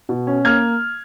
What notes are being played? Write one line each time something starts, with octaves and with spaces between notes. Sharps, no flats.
B2
C#4
A#3 F6 G#6